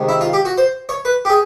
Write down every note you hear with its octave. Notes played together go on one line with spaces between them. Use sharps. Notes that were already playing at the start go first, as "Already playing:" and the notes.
Already playing: C3 D#3 G#3
E4
F4
G4
F#4
C5
C#5
B4
G4
G#4